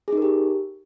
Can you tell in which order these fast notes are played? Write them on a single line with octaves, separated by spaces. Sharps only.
G#4 D#4 A#4 G4